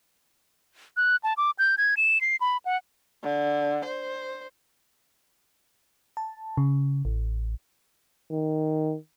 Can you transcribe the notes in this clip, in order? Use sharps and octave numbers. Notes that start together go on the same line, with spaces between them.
F#6
A5
D6
G6
G#6
E7
C7
B5
F#5
D3
C5
A5
C#3
A1
D#3